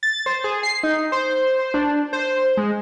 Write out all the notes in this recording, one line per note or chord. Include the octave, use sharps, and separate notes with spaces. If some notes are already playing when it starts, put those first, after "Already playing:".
A6
C5
G#4
C7
D#4
C5
C5
D4
C5
G#3